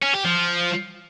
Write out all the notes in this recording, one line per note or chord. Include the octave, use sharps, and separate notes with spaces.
C#4
G4
F3